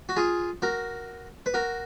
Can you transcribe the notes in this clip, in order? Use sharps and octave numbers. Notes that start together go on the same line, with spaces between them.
F#4
F4 G#4
F#4 A#4
B4
F#4 A#4